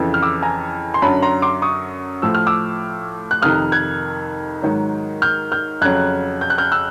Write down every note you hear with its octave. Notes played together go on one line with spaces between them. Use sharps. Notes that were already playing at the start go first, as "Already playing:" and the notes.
Already playing: F2 C#3 E3
F6
D6 E6
G#5 A#5
C6
F#2 D3 F#3 A5 B5
A#5 C6
C6 D6
C#6 D#6
A2 F3 E6
F6
D6 E6
F#6
F2 C3 D#3 D#6 F6
F#6 G#6
G#2 D#3 F#3
F6 G6
F6 G6
F2 C#3 F#3 F#6 G#6
G6
F#6
F6 G6
E6 F#6